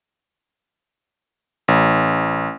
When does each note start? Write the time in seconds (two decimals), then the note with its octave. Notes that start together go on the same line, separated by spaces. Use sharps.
1.68 A1